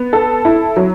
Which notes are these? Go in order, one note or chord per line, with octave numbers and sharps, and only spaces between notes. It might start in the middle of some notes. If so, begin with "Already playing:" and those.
Already playing: B3
A4
E4
F#3